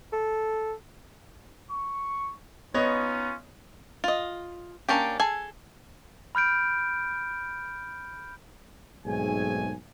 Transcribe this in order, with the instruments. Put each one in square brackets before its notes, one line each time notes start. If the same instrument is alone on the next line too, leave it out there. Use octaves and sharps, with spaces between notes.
[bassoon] A4
[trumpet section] C#6
[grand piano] B3 C#5 D#5 [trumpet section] C#4 D#4 F4
[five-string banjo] F4 D#5
A#3 C#4 D4 G4
G#4 A4 G#5
[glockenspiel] B5 F6 G6 D7
[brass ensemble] B1 G#2 A3 C4 G#4 G#5